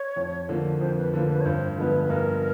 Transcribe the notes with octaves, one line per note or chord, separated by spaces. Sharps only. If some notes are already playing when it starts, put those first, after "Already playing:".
Already playing: C#5
F2
D3 F3 A#3
F2 C5
B4
D3 F3 A#3 B4
B4
C#5
G2 C5
D3 F3 G#3 B3 B4
B4
G2 A#4